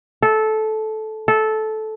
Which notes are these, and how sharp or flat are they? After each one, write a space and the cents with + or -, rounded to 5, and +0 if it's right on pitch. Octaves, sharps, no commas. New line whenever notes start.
A4 -15
A4 -15